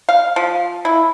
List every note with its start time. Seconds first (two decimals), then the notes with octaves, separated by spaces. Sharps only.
0.09 F5
0.36 F3
0.85 E4